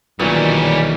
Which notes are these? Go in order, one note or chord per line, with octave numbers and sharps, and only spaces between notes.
B1 A#2 D#3 E3 G3 C#4 B4